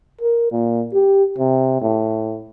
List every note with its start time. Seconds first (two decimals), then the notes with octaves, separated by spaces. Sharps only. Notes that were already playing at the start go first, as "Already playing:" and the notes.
0.21 A#4
0.52 A#2
0.94 G4
1.38 C3
1.82 A2